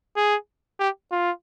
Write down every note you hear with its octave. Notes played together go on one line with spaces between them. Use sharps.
G#4
G4
F4